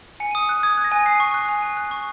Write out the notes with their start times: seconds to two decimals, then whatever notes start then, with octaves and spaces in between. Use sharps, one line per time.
0.20 G#5 C#7
0.31 D#7
0.35 D#6
0.42 C#7
0.49 F#6
0.63 D#6 G#6
0.77 F#6
0.84 A#6
0.92 G#5
1.06 G#5 C7
1.20 C#6
1.34 F#6
1.49 G#5
1.62 G#5
1.77 F#6
1.91 C#6